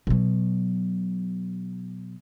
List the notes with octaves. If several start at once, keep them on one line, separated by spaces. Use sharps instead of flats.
B2 F#3